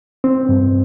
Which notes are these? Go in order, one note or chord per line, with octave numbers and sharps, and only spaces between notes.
C4
G2